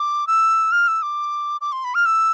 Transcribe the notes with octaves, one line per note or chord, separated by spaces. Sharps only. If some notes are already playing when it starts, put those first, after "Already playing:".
Already playing: D6
E6
F6
E6
D6
D6
C6
B5
F6
E6